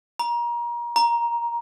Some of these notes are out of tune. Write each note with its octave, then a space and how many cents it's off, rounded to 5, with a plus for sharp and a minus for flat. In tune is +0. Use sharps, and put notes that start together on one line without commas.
A#5 +30
A#5 +10